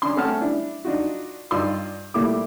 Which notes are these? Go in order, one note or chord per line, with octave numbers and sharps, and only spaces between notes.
C#4 D4 C6
A3 C4 C#4 F#5 A5 F6
D4 E4
D4 D#4 F4 F#4
G2 D#4 F4 D5 C6 E6
A#2 G3 A3 E4 D6